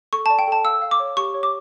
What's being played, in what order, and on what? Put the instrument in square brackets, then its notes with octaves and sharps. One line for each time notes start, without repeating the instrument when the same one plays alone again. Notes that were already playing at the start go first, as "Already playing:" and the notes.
[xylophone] A4 C#6
D5 A5
G5
A4 A5
F5 E6
F5
D6
C#5
G4 C#6
C#5
D6